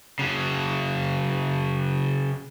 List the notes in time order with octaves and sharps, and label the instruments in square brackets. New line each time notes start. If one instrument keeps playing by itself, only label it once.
[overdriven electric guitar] C#3 F#3